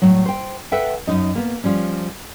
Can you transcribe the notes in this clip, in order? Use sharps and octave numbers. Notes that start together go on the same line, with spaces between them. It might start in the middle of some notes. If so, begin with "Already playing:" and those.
A2 F#3
C5 G5
A4 B4 E5 F#5 G5
F#2 D#4 D#5
A#3 B3
F3 G3 C#4